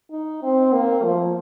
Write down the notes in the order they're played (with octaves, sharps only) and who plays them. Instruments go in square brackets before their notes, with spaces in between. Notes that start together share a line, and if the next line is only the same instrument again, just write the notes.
[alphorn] D#4
C4
A#3
F3